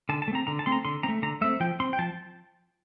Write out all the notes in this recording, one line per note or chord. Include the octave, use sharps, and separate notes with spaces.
D3 A5
A5
A3
C4 A#5
D3 A#5
A5
A3 C4 C6
A#5
D3 C6
C4 A#5
A3
D3 A#5
A3 C4 E5
F3 G5
C4 C6
G5
F3 A5